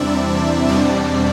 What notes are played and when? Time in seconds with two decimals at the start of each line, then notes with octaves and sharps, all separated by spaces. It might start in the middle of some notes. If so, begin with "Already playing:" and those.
Already playing: E2 C3 G3 C4 D4 E4 D5 E5
0.68 E2 B2 G3 C4 D4 D5